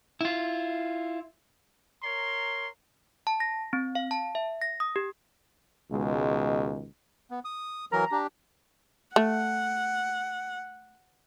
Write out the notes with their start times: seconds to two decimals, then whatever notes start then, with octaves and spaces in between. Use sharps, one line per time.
0.21 E4 F4
2.04 A#4 C#5 A#5 C6
3.27 A5
3.40 A#6
3.73 C4
3.95 F5
4.11 A5
4.35 E5
4.62 A#6
4.80 D#6
4.96 G4
5.92 C#2 B2 D#3 G#3
7.31 B3
7.45 D#6
7.92 E3 F#3 A#4 A#5
8.12 D4 G4
9.16 A3 F#5